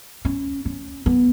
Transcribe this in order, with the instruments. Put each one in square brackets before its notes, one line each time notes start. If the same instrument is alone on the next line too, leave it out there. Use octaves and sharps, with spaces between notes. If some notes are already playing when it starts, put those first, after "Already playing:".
[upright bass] C#4
C#4
B3